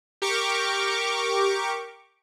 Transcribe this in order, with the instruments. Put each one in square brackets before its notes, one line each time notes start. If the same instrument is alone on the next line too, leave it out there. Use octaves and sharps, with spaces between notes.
[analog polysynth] G4 A#4 C#6 D6